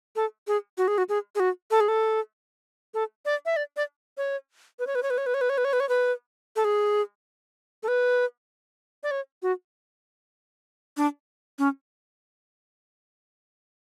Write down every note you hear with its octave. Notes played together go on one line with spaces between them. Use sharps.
A4
G#4
F#4
G#4
F#4
G#4
G#4
F#4
A4
G#4
A4
A4
D5
E5
D5
D5
C#5
B4
C#5
B4
C#5
B4
C#5
B4
C#5
B4
C#5
B4
C#5
B4
C#5
B4
A4
G#4
A4
B4
D5
C#5
F#4
D4
C#4